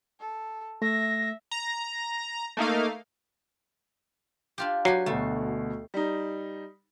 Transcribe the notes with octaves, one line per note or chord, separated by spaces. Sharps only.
A4
A3 E5 A#6
A#5
A3 A#3 D#4 F5
D4 F4 G4
F#3 G4 B4 G#5 C7
D2 B2 A3
G3 D#4